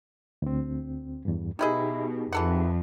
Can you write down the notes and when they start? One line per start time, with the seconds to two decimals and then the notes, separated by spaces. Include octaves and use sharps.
0.42 D2 C4
1.25 E2 G2
1.59 B2 D#3 D#4 E4 G4 G#4 D#5
2.33 F2 E3 A4 F#5